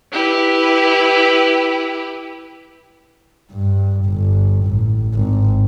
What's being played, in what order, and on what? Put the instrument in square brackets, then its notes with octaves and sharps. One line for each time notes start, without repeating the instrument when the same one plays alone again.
[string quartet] E4 G4 B4
[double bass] G2
G1
A1
G#1